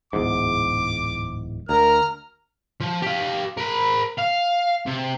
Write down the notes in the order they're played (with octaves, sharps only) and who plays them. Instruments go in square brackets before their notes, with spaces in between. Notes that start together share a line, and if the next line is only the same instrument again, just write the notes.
[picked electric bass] D1 E2 G#2 [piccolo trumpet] D6
[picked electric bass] D2 [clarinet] A#4 [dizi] A#5 [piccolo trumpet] F6
[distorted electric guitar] F3
G4 F5
A#4 B5
F5
C3